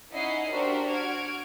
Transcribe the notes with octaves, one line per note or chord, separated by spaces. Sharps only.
C#4 D#4 E4 D#5 F#5 C7
D4 F#4 G4 A#4 C5 E5
F#4 F#5 F6 G#6 D7